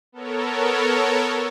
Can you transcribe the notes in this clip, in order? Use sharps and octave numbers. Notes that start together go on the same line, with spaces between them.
B3 A4 A#4 C#5